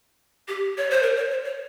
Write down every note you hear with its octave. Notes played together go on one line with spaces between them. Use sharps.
G4
C#5
C5
A#4
C#5
C5
C#5